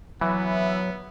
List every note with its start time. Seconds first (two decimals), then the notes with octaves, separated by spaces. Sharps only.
0.21 E3 F#3 B3 E5